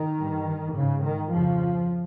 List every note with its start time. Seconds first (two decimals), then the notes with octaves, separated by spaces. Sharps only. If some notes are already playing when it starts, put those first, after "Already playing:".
Already playing: D#3
0.19 G2
0.75 G#2 C#3
1.04 D#3
1.32 F2 C#3 F3